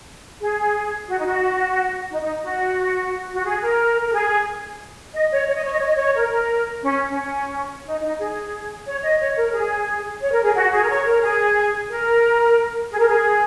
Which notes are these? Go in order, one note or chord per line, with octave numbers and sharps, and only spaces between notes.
G#4
F#4
D#4
F#4
D#4
D#4
F#4
F#4
G#4
A#4
A#4
G#4
D#5
C#5
C#5
D#5
C#5
D#5
C#5
D#5
C#5
A#4
C#4
C#4
D#4
D#4
G#4
C#5
D#5
C#5
A#4
G#4
C#5
A#4
G#4
F#4
G#4
A#4
C#5
A#4
G#4
A#4
G#4
A#4
G#4